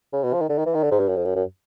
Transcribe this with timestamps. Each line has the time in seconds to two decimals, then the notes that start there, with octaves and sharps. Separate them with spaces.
0.13 C#3
0.24 B2
0.33 F3
0.41 D#3
0.49 D3
0.58 D#3
0.66 E3
0.75 D#3
0.83 D3
0.91 G#2
1.00 G2
1.08 F#2
1.16 F2
1.25 F#2
1.36 F#2